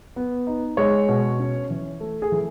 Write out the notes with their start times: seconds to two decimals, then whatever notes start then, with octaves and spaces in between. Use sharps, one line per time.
0.16 B3
0.47 D#4
0.77 G#3 C#5
1.09 B2
1.39 C#4
1.70 E3
2.01 A3
2.22 G#4
2.32 E3